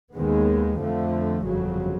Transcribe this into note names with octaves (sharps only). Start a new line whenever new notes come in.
D#2 D#3 G#3 B3
F2 D3 F3 A3
G1 F2 C#3 F#3